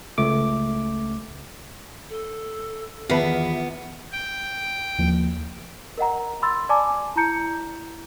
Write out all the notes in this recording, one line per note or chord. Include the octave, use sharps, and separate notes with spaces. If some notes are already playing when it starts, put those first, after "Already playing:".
C#2 A3 D6
A4
E2 D#3 B3 F4 B4 E5 A5
G5
D#2 F3 A#3
A#4 D#5 F#5 A#5
B5 C6 E6 A6
D5 G#5 A5 D6
E4 A5 A#5 G6 C#7